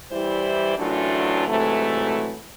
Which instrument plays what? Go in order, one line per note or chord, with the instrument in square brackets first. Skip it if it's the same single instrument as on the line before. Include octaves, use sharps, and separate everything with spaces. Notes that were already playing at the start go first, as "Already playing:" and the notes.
[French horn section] E3 G3 E4 G4 C5 D5
F#2 A2 E3 F#3 D4 F4
G#2 C3 E3 F#3 A3